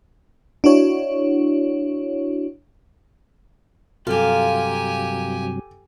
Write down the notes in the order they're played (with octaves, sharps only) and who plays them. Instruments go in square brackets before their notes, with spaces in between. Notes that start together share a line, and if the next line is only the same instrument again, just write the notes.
[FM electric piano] D4 E4 F#4 C#5
[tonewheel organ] G2 C3 F#3 [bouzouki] A#3 F4 [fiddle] G4 G#5 [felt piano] A4